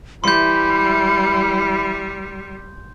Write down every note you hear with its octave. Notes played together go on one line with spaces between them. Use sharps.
E3 G3 E4 B5 C6 G6